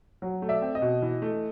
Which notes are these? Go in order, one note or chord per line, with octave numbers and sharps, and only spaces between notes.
F#3
A3
D5 E5
C4
D#5
B2
E3
A3